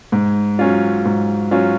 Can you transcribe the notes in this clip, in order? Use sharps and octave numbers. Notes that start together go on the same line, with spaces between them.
G#2
F#3 C#4 F4
G#2
F#3 C#4 F4